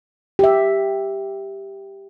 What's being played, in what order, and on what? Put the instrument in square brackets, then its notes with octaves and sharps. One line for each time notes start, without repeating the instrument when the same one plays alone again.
[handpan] G4 E5